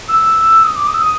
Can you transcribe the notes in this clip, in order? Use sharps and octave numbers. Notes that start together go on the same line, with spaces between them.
E6
D#6
D6
D#6
E6
D#6